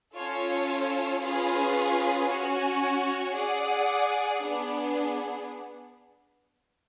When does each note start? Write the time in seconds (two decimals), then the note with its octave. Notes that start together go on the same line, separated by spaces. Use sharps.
0.13 C#4 F4 A4 C#5
1.20 C#4 F4 G#4 B4
2.27 C#4 F#4 C#5 G#5
3.33 G#4 D5 F#5
4.41 B3 D4 G#4